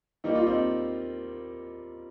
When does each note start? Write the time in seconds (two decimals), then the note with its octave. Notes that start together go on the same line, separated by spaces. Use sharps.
0.24 D#3 G3 A#3 D#4
0.35 F4
0.46 C4 D#4